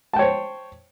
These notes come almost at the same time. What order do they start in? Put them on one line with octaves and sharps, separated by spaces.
A5 G5 C#5 C5